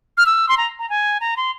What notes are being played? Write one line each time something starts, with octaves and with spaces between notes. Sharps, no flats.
F6
E6
C6
A#5
A#5
G#5
A#5
C6